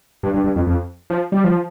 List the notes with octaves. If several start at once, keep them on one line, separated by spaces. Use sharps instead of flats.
G2
G2
G2
F2
F2
F3
G3
F3